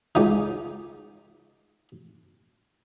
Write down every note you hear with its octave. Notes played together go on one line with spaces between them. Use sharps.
C#2 D#4